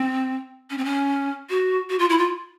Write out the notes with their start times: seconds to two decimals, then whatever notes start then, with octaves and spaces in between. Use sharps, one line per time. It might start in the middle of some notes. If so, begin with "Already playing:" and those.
Already playing: C4
0.70 C#4
0.78 C4
0.85 C#4
1.50 F#4
1.89 F#4
1.99 F4
2.10 E4
2.18 F4